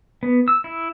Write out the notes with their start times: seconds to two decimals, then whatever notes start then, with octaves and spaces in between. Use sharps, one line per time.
0.23 B3
0.48 E6
0.64 E4